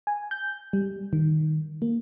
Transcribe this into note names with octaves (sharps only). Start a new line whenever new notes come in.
G#5
G6
G3
D#3
A#3